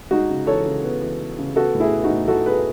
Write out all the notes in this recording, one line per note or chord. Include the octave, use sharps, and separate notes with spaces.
G#3 D#4 F#4
C#3
E3 A4 C#5
C#3
B3
E3
B3
C#3
B3 F#4 A4
A2
E4 G#4
B3
D#4 F#4
A2
A2 F#4 A4
B3 G#4 B4